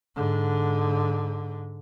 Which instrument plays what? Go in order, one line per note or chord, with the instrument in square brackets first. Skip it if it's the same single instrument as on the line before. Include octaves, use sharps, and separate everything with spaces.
[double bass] G#2 D3